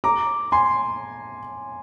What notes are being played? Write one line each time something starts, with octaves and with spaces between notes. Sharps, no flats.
A#5 D6
G#5 C6